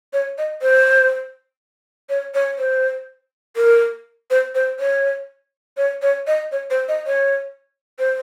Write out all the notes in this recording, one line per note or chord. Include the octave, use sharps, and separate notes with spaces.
C#5
D#5
C5
C#5
C#5
C5
A#4
C5
C5
C#5
C#5
C#5
D#5
C#5
C5
D#5
C#5
C5